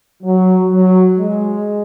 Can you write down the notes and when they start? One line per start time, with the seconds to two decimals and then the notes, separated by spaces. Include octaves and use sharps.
0.23 F#3
0.70 F#3
1.18 G#3